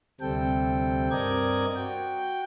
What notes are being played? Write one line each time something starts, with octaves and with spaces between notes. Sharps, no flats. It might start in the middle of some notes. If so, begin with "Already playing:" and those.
D2 C3 G3 C4 A4 G5
G2 C4 A#4 D5 D#5 G#6
F#4 G5